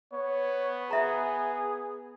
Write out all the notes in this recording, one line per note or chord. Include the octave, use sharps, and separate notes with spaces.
B3 C#5
G#4 B4 E5 A#5